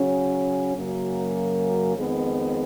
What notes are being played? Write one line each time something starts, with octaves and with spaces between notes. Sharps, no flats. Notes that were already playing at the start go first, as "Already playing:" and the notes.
Already playing: C#3 F#3 C#4
F#2 C#3 F#3 A#3
F2 D#3 G#3 B3